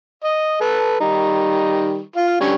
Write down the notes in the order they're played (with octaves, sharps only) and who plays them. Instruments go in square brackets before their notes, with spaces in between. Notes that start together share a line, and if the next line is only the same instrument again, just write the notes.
[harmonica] D#5
A4 B4
D#3 G3 D#4
F4 F5
D3 G3 C#4